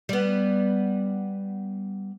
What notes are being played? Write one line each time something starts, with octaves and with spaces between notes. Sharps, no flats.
G3 B3